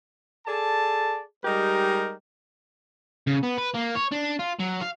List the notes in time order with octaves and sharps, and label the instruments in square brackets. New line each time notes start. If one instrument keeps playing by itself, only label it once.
[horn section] G#4 A4 D5 A5
G3 G#3 D#4 G4 A#4
[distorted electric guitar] C#3
B3
B4
A#3
C#5
D4
F4
F#3
F5